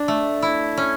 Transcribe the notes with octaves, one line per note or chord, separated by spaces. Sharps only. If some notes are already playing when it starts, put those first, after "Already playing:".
Already playing: D4
A3
E4
C#4